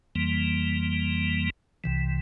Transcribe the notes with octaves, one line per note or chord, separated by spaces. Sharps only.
F2 E3 G3 A#3
C2 C3 E3